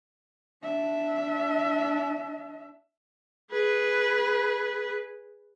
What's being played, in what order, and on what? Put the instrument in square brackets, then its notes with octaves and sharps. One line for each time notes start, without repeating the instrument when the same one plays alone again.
[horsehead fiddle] D4 E5
[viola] G#4 B4